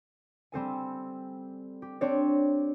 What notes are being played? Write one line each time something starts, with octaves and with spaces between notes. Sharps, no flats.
G3 C4 A4 G#5
G4
C4 D4 C#5 D5